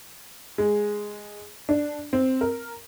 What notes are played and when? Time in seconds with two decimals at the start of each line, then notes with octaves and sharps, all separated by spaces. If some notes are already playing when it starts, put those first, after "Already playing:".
0.58 G#3
1.69 D4
2.13 C4
2.41 A#4